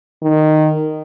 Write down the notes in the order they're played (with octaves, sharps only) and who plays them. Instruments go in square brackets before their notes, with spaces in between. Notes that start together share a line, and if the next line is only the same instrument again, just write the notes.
[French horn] D#3